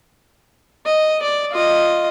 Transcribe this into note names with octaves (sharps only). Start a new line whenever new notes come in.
D#5
D5
F4 D#5